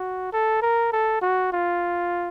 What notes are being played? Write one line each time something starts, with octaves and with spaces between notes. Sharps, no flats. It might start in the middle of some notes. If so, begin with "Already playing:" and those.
Already playing: F#4
A4
A#4
A4
F#4
F4